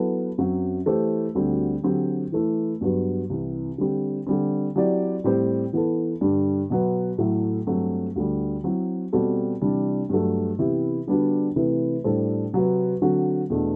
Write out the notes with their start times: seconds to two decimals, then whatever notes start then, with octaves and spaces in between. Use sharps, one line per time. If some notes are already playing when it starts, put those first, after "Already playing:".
Already playing: F#3 B3 E4 A4
0.38 F#2 F#3 C4 F#4
0.86 E3 A3 E4 G4 C5
1.35 D2 D3 G3 C4 F#4
1.84 D3 F#3 C4 G4
2.32 E3 A3 E4
2.81 G2 F#3 B3 F#4
3.30 C2 C3 E3
3.78 D3 G3 C4 G4
4.27 D3 G3 C4
4.76 F#3 C4 E4 G4 D5
5.24 A2 G3 C4 G4 C5
5.73 E3 B3 E4 A4
6.21 G2 D3 G3 D4
6.70 B2 F#3 B3
7.18 A2 F#3 A3 E4
7.67 G2 F#3 A3 C4
8.16 D2 D3 G3
8.64 F#3 C4 E4
9.13 B2 G3 C4 F#4 A4
9.61 C3 E3 G3 D4
10.09 G2 F#3 A3
10.58 C3 E3 B3 E4 G4
11.07 D3 G3 B3 D4 F#4
11.56 C3 E3 A3 E4 B4
12.04 A2 G3 D4 A4 C5
12.53 C3 F#3 C4 F#4 B4
13.02 D3 F#3 C4 F#4
13.50 E2 B2 A3 D4